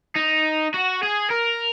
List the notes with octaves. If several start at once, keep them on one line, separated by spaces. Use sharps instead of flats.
D#4
F#4
G#4
A#4